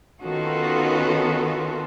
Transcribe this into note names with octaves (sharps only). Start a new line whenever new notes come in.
D#3 B3 C#4 F4 F#4 A4